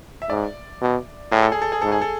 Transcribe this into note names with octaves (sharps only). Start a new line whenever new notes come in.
E5
G#2 D5
B2
A2 G#4
A4
G#4
A4
G#4
G#2 A4
G#4
A4